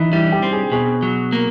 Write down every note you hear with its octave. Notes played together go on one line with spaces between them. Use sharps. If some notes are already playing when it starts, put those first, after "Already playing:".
Already playing: E3 D#4 E4
G3 E4
G4
C4
G#4
B2 G#4
F#3
A#3